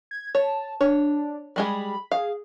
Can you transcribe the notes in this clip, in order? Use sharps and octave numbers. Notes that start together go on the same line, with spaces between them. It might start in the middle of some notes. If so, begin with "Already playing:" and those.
G#6
C#5 A5
D4 C#5
G3 G#3 G#4 B5
G#4 F5